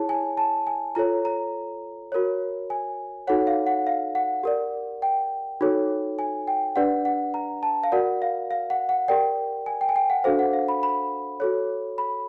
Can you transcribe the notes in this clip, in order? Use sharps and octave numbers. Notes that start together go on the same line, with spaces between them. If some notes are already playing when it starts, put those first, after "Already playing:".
Already playing: E4 G#4 C#5 A5
G#5
A5
G#5
F4 A4 C#5 A#5
A#5
F#4 A#4 C#5
G#5
D#4 F#4 A4 C#5 F#5
F5
F#5
F5
F#5
G4 A#4 D5
G5
D#4 F#4 A4 C#5
G#5
G5
D4 G4 B4 D5 F#5
F#5
A#5
A5
F5
F#4 A#4 D5 F#5
F5
F5
F#5
F#5
G4 A#4 D5 G5
G#5
G5
G#5
G5
F#5
D4 F#4 A4 C5 F5
F#5
F5
B5
B5
F#4 A4 C#5
B5